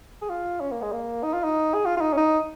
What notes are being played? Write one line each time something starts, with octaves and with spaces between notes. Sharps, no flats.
G#4
F4
C#4
A#3
G#3
A#3
D#4
F4
D#4
G#4
F4
F4
D#4
C#4
D#4